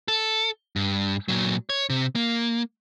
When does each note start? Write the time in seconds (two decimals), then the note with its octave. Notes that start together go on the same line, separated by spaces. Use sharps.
0.08 A4
0.76 G2
1.28 A#2 F#3
1.70 C#5
1.90 C3
2.15 A#3